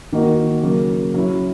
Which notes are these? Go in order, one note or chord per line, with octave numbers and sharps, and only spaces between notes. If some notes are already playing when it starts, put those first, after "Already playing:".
D#3 A#3 D#4 F#4
C#3 F#3 A#3
F#3 C#4 E4